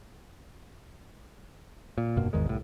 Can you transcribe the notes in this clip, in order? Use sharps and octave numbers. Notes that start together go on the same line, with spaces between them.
A#2
F1 G2 B2 A#3
G#1 E2 D#3 G#3
C2 A2